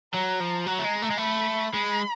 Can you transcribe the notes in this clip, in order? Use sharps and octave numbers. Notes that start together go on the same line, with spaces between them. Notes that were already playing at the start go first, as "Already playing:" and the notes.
F#3 A#5
F3
F#3 A#5
A3
G#3
A3
G#3
A3 B5
G#3 B5